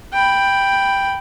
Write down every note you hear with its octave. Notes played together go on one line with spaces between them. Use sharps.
G5 B5